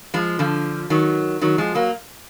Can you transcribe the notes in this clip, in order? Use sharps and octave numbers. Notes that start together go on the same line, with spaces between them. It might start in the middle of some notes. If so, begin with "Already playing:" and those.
F3 G#3
D3 F3
D#3 F#3
D#3 F#3
F3 G#3
F#3 A#3